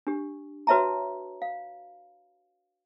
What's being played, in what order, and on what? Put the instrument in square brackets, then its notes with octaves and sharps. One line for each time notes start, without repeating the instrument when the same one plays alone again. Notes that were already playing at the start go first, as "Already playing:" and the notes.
[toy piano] D4 G4
F#4 B4 C#5 E5 A5 A#5
F5